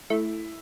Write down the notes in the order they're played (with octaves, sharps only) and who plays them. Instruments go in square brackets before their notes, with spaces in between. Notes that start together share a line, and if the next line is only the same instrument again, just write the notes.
[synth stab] A3 [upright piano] E4